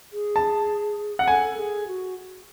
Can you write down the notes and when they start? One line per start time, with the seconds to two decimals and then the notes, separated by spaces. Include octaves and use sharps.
0.13 G#4
0.36 A5
1.19 F#5
1.27 A4 G#5
1.57 G#4
1.87 F#4